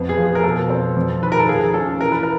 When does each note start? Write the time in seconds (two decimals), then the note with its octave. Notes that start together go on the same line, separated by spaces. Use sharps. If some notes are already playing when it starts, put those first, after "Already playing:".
Already playing: F2 B3
0.09 G#4
0.17 F3
0.26 G#4
0.35 A#4
0.43 B2 A4
0.70 C4
0.97 F2
1.22 D#3 B4
1.32 A#4
1.40 A4
1.48 F3 G#4
1.74 C#4 A4
2.00 E3 A#4
2.12 B4
2.23 A#4